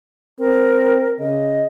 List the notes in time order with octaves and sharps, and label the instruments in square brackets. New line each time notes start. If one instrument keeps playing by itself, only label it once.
[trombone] C4 [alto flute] A#4
[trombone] C#3 [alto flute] D#5